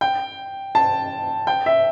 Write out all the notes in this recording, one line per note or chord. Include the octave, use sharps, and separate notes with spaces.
G5
A5
G5
E5